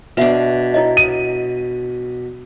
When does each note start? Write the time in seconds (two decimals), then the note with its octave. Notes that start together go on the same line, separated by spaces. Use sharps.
0.17 B2 D4 B4 E5 F#5
0.74 E4 C#5 D#5
0.97 D#7